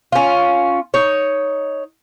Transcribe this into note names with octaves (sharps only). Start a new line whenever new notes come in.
C#4 F4
D#4 C#5